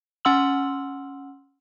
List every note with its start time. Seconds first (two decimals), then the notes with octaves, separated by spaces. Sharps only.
0.25 C#4 F#5 C6 E6 F#7